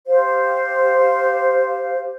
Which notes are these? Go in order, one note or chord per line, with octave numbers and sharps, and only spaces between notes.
G4 C5 F5